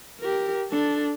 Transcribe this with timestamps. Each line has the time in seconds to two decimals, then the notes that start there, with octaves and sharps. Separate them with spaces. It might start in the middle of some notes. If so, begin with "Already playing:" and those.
0.20 G4 A#4
0.71 D4 A4